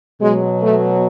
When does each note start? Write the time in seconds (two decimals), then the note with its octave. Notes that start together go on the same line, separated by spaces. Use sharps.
0.21 B2 F#3 G#3
0.62 A3